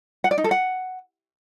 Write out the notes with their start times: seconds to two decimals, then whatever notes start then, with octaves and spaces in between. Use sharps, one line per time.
0.24 F#5
0.31 D5
0.38 D#4
0.44 A4
0.51 F#5